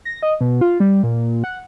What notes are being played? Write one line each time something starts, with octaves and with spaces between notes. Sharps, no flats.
A#6
D#5
B2
F4
G3
A#2
F#5